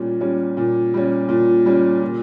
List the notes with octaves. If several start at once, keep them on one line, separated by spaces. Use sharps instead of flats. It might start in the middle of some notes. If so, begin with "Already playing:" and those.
Already playing: A#2 G3 C#4
G3 C#4
A#2
G3 C#4
A#2
G3 C#4
A#2